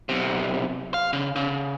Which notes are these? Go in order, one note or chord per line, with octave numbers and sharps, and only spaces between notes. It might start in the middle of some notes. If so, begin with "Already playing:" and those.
B1 C3
F5
C#3
C#3